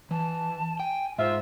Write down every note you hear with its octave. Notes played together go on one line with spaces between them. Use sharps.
E3 A5
G5 G#5
G#2 F4 C5 E5